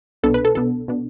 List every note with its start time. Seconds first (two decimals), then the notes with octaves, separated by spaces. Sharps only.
0.23 C2 B2 B3 D4 A4
0.34 B4
0.45 A4
0.55 C2 B2 B3 D4 A4
0.88 B2 B3 D4